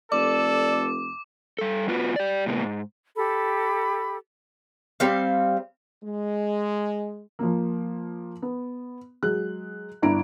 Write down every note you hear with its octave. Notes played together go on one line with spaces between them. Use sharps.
F1 A4 D5 D6
G3 A4
B3 F4 F#4 B4
G4 D5
A2 C3 G#3 A#3 B3
G#2
G4 A4 B5
G3 C4 F5
G#3
F3 A#3
B3
F#3 G#3 F#6
G1 D4 E4 A#5 D7